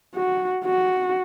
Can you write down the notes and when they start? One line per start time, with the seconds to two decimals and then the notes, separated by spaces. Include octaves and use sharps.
0.15 F#4
0.65 F#4